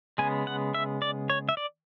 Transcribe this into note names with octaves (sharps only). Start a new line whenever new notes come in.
C#3 G#3 B3 G#5
F#5
E5
D5
C#5
E5
D5